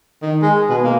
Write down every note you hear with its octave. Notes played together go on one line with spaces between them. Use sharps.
D#3
G#3
B2
A#3